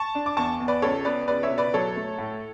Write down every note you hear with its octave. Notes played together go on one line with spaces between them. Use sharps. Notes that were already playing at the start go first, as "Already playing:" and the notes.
Already playing: A5 C#6
D4
D6
E2 A5 C#6
E2
B4 D5
C#2 A4 C#5
B3 B4 D5
C#2 B4 D5
C#5 E5
B2
B4 D5
F#3 A4 C#5
A3
A2